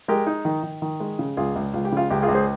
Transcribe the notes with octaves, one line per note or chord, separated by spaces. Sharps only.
G#3 G4 A#4
D#4
D#3
D#3
D#3
G#3
C#3
C#2 F4 G#4
C#2
C#2 F4
G4
C#3 F4
C#2 G4
F4 G#4
C#2
G#4 C5